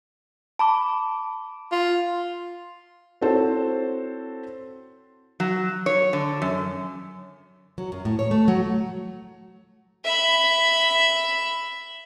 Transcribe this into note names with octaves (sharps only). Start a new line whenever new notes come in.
A5 B5 D6
F4
C4 E4 F#4 A4 C5 C#5
F#3
C#5
D3
F#2
F#3
F#2
A2
C#5
A3
F#3
E5 B5